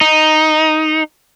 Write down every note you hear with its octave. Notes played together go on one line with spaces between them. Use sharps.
D#4